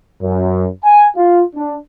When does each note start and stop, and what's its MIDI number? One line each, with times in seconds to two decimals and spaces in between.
0.22 0.65 42
0.84 1.08 80
1.16 1.41 65
1.56 1.75 62